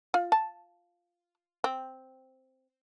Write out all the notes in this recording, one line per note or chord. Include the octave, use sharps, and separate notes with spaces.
F4
A5
C4